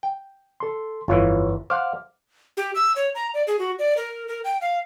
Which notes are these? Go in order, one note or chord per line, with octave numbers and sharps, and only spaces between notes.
G5
A4 C6
G1 F2 E3 F4 C#5
C5 F5 F#5 D6 F6
G4
E6
C#5
A#5
D5
G#4
F#4
D5
A#4
A#4
G5
F5